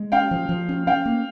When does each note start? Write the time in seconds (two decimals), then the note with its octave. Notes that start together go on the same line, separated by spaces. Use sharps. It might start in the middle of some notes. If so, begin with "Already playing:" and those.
Already playing: G#3
0.12 C#4 F5 G5
0.31 F3
0.49 F3
0.69 C#4
0.87 C#4 F5 G5
1.06 A#3